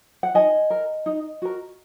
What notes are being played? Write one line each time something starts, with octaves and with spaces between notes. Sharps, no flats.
F#5
D#4 D#5 G#5
A#4
D#4
F#4 A#4